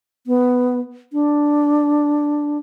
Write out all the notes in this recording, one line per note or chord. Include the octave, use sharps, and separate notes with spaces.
B3
D4